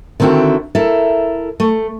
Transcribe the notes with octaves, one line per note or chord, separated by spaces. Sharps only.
D3 D#3 C4 E4 F#4
E4 A4 A#4
A3